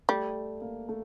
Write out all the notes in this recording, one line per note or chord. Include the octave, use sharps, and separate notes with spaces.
G3 A3
A#3
A3